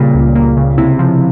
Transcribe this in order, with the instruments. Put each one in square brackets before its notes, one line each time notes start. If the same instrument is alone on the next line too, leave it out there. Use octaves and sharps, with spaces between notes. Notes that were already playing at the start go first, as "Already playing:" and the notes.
Already playing: [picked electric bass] A#2 [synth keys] C#3 G3 A#3
[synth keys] C#2
A#3
C#3
[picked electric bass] C3 [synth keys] E4
[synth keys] F3